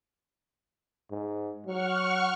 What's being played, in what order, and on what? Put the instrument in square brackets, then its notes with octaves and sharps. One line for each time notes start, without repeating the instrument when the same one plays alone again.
[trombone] G#2
[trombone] F#3 [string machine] F#5 C#6 F6